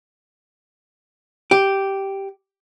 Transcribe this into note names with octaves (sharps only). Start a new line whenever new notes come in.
G4